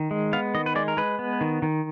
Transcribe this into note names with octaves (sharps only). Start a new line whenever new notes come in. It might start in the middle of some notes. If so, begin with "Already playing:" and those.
Already playing: D#3
G#3
B3 F5
D#3 D#5
B4
G#3 D5
A#4
G#3 B4
B3
D#3
D#3